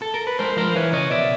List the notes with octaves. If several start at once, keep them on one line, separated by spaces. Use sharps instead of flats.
A4
A#4
B4
G#3 A#4 C5
F3 A#4 C5
E3 B4 C#5
C#3 C#5 D#5
B2 D5 E5